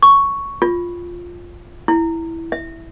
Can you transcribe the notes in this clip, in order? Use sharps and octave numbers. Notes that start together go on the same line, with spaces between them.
C#6
F4
E4
E5